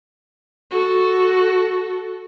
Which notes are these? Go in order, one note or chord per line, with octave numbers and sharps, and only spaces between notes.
F#4 A4